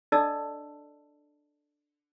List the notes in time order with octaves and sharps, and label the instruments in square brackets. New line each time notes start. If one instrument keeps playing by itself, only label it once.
[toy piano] D4 A4 D5 D#5 A5 E6